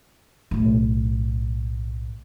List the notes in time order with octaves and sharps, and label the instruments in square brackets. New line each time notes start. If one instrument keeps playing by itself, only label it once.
[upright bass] B1 A2